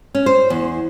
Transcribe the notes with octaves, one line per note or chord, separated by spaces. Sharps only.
C#4
C5
E2